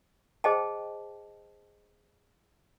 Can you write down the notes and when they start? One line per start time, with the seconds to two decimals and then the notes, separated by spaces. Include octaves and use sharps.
0.44 G#4 C5 D#5 G5 A5